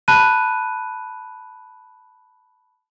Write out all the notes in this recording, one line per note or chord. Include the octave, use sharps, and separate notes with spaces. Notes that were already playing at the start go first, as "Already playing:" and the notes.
A5 B5 F#6 D#7